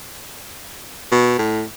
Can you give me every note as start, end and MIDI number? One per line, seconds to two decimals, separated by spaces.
1.12 1.34 47
1.38 1.63 45